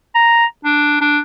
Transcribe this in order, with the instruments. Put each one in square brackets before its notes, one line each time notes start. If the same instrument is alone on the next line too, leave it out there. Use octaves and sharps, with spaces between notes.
[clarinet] A#5
D4
D4